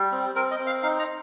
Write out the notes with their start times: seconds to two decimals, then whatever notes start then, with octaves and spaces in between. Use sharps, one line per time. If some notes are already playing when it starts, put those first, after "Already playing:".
Already playing: G3
0.12 C4
0.35 C4 A#4
0.51 D#5
0.59 C4
0.67 F5
0.83 D#4 F5
0.99 A#5